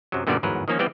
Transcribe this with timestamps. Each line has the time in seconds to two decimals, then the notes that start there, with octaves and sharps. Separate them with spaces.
0.12 F#2 C3 F#3
0.27 F#2 A#2 D3 G3 B3 D5
0.43 G1 E2 G#2 F#3 A#4 B4
0.68 D#3 F3 A#3 C#4 D#4
0.79 E3 G3 B3 C4 D5 G5